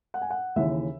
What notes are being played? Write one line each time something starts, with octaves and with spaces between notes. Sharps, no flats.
F#5
G#5
F#5
D#2 C#3 E3 E5